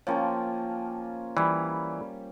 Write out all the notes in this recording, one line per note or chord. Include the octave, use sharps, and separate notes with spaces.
F3 A#3 C#4 C#5 G5 A5
E3 G3 D5 B5